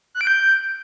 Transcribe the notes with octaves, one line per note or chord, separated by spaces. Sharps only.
F#6
D7
G6